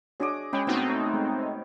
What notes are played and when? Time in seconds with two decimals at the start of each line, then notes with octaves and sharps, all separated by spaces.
0.20 D4 F#4 G#4 C#5 D#5 D6
0.53 G#3 C#4 B4 G5
0.67 B2 D#3 A3 B3 C4 D#4 F#4
0.88 C#5
1.14 G#3